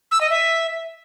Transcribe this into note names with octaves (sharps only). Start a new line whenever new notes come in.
E6
D#5
E5